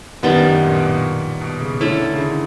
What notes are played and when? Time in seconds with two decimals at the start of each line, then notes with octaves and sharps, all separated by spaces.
0.23 F#2 D#3 G3 B3
0.35 G2
0.47 F#2
0.62 A#2
0.75 B2
0.86 A#2
1.41 B2
1.61 C#3
1.81 D3 A3 C#4 E4 A4
1.95 E3
2.01 D#3
2.14 C#3
2.20 D3